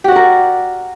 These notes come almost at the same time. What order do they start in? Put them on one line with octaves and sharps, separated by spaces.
G4 F#4 D5 A#4